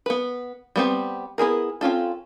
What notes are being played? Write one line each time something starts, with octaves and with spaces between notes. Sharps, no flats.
B3 B4
G3 B3 C4
B3 E4 G#4 A#4
C4 C#4 F4 A4